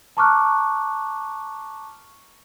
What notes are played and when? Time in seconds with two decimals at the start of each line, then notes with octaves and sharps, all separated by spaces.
0.17 A5 A#5 C#6 D6 F6 F#6